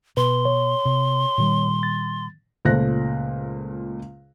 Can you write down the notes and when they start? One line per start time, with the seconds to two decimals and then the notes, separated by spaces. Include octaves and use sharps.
0.17 B2 B4 C6
0.45 C#5
0.85 C3
1.38 A#2 D#3 G3
1.83 A6
2.65 C#2 A#2 A3 C5 F#6 A#6